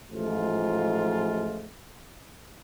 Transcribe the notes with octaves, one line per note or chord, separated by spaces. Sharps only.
A1 G#2 F3 G#3 A3 F4